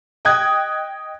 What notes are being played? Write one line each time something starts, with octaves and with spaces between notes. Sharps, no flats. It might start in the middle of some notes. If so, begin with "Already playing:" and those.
D#5 G5 D#6 F#6 G#6